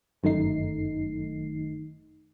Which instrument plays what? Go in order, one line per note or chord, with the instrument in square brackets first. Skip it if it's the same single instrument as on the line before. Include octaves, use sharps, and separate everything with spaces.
[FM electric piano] G1 F#2 D#3 A3 D#4 C7